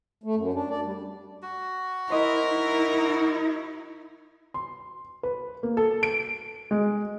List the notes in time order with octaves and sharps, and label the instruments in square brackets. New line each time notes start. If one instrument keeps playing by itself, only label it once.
[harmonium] A3
F#2
D4
D5
G3
[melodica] F#4
[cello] E4 [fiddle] A#4 [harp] C5 D#5
[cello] D#4 E4
[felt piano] C6
B4
A#3
A4
D7
G#3